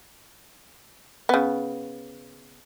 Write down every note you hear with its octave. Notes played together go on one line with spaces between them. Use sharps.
C#3 B3